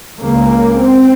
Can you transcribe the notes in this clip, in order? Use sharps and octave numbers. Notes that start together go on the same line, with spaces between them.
C#2 C#3 A#3
C4